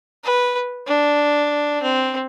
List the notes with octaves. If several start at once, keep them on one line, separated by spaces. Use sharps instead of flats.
B4
D4
C4